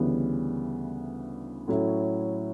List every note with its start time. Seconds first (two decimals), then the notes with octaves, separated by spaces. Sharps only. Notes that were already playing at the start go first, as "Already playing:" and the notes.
Already playing: D2 C#3 E3 G3 B3
1.68 A2 F#3 C#4 E4